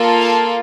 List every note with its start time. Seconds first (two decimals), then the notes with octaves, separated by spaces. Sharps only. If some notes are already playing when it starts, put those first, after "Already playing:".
Already playing: A#3 F4 A4
0.20 F5 A5